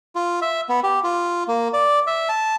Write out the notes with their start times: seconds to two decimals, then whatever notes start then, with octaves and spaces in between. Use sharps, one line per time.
0.15 F4
0.42 E5
0.69 B3
0.84 G4
1.04 F4
1.48 A#3
1.73 D5
2.07 E5
2.29 A5